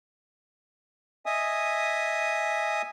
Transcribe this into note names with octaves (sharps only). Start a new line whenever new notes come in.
D#5 E5 G#5 D#6